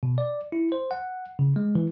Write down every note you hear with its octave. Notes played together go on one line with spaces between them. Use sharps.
B2
D5
E4
C5
F#5
C#3
G#3
E3